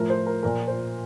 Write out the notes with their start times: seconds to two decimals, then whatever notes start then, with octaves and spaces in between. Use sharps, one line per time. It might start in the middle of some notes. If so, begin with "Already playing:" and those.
Already playing: A2 F3 A#4
0.10 C5
0.27 A#4
0.43 A#2 F3 A#4
0.68 C5